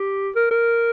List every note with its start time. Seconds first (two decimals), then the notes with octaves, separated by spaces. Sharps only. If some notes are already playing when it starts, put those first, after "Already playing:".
Already playing: G4
0.35 A#4
0.51 A#4